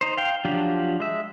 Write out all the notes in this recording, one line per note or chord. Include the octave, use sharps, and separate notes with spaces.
D#4 C5
F5 G5
F3 F#3 D4 F4 G4
G#3 E5